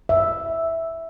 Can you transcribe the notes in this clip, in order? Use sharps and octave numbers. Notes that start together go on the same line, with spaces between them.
E5